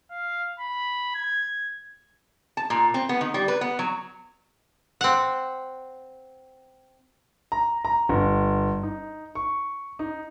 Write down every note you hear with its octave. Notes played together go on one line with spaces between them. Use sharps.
F5
B5
G#6
A5
A#2
C4
B3
D#3
G3
B4
B3
F#3
C4 F#5
A#5
A#5
G1
D#4
C#6
D#4